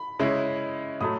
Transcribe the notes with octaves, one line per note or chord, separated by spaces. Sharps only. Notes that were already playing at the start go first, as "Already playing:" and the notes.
Already playing: B5
C#3 G#3 C#4 E4
A2 F#3 A3 D#6